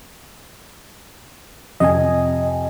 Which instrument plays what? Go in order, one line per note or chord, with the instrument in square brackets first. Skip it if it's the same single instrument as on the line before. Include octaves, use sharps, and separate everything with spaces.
[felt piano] F2 C3 [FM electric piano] D#5 G#5